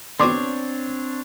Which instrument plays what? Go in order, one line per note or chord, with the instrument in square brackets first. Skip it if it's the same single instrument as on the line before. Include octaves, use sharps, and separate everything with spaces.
[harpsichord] D3 B3 F#4 [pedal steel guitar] C4 D4 C#5 [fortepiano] C6 D6